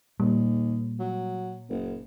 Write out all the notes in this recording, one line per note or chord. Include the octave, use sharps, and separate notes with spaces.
D#2 A#2 G3
F#3
F#1